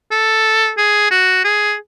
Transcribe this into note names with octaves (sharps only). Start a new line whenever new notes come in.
A4
G#4
F#4
G#4